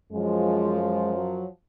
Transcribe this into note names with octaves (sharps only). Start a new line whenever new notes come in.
F#2 F3 G#3
G#3
F#3